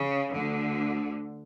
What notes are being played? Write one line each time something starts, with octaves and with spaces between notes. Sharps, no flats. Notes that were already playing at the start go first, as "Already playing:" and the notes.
Already playing: C#3
D2 D3